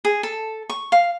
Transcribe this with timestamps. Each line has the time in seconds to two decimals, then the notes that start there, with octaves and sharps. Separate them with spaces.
0.05 G#4
0.23 A4
0.70 C#6
0.92 F5